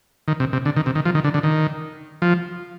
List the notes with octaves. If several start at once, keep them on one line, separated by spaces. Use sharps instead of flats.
D#3
C3
C3
D3
D#3
C3
D#3
F3
D#3
D3
D3
D#3
F3